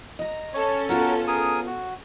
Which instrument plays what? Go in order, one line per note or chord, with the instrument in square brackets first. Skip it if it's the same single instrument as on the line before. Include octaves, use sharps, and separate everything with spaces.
[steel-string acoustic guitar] D#5 A#5
[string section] C#4 A4 [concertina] C#5
[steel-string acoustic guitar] B3 F4 [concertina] F#4 A#4
[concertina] G#4 A#4 D#6
F#4